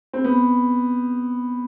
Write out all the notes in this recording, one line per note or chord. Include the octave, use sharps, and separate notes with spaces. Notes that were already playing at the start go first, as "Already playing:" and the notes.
C4
B3